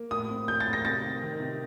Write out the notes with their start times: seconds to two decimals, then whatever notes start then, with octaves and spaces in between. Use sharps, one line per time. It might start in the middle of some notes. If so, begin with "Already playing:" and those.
Already playing: A#3
0.11 A2 D#6
0.30 C4
0.48 A2 G6
0.60 A6
0.67 C4
0.73 A#6
0.85 C3 A6
1.03 D#3
1.22 D#3
1.40 C3